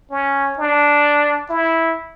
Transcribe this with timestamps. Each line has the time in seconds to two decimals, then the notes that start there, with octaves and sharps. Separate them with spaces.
0.11 C#4
0.58 D4
1.50 E4